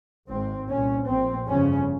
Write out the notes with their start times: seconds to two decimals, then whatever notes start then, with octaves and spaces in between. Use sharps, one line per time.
0.28 G#1 G#2 C4
0.68 C2 A#2 C#4
1.07 A#1 A#2 C4
1.47 G1 F2 C#3 C#4